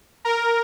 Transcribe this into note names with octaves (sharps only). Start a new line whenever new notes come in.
A#4